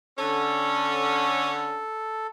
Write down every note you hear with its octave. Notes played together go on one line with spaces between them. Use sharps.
D3 C#4 A4